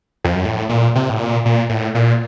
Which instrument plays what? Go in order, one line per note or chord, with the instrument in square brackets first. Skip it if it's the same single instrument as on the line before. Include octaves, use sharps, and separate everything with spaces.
[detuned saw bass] F2
F#2
A2
A#2
C3
A2
A#2
A#2
A2
A#2